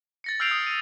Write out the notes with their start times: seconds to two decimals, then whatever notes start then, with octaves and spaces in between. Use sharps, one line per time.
0.24 A6 A#6 C#7
0.40 E6 F6 G6 C7 D7 F7
0.51 D#6
0.67 D#7